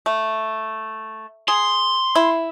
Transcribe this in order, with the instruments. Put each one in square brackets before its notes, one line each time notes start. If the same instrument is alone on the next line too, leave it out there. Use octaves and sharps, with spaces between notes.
[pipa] A3
[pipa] G#4 [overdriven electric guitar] C6
[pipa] E4